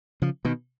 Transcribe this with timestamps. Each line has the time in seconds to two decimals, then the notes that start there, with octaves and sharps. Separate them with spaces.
0.22 C#3 F3
0.45 B2 D#3